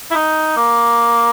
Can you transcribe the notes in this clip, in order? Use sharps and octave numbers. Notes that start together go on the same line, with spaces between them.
E4
D#4
A#3